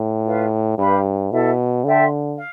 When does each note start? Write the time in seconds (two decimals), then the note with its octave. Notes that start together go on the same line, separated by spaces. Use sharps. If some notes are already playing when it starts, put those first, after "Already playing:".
Already playing: A2
0.25 F4 B4 F5
0.78 G2 G4 B4 F5 B5
1.31 B2 E4 A4 E5
1.84 D3 A4 E5 G5 C6
2.37 F5